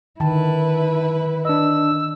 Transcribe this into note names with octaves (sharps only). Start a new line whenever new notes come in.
D3 D#3 E4 B4 G5 A5
D4 D#5 E6